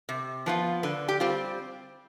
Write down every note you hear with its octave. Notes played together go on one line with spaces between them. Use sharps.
C3
F3 B3 F4
D3 B4
G4
G3 C4 F4